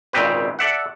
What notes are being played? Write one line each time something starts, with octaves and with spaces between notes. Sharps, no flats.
G#1 A#2 C#3 C4 G4 B4
A4 D5 E5 F#5